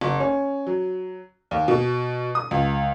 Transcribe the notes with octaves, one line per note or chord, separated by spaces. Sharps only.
F#1
C#4
F#3
D#2
B2
D#6
C#2